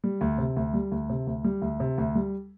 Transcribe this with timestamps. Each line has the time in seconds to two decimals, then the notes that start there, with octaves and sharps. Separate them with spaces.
0.04 G3
0.21 D2
0.38 C3
0.56 D2
0.74 G3
0.92 D2
1.10 C3
1.27 D2
1.44 G3
1.62 D2
1.80 C3
1.98 D2
2.15 G3